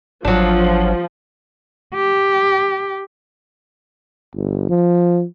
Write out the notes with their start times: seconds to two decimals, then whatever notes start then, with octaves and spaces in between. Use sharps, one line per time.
0.25 G#1 F3 F#3 D4
1.94 G4
4.34 G1
4.69 F3